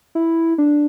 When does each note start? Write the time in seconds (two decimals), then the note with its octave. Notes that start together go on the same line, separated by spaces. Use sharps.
0.15 E4
0.58 D4